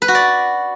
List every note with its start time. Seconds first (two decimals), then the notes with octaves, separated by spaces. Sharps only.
0.02 B4
0.08 F#4
0.15 D5